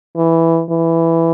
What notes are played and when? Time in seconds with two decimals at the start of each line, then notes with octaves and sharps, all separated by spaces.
0.17 E3
0.70 E3